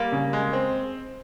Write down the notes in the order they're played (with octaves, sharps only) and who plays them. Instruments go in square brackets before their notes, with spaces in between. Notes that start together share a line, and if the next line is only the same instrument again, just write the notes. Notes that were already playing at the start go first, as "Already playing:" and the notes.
Already playing: [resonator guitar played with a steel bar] G3 A#3
[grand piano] C#3
G#3
C4